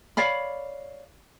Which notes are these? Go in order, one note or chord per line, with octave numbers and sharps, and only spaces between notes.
C#5 D5 F5 B5